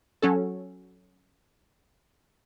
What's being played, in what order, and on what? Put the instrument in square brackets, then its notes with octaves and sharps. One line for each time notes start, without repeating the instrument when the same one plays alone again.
[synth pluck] F#3 C#4 A4